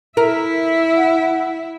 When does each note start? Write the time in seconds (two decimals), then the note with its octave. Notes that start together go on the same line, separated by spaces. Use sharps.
0.17 E4 A#4 E5
0.97 F#5